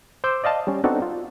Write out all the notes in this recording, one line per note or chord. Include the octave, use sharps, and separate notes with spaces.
C5 C6 D6 E6 G6
D5 D#5 F5 A5
G3 C#4
B3 C4 D4 D#4 F#4 A4
F4